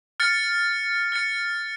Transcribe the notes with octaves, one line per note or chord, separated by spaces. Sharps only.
F6 A6 C#7
F6 A6 C#7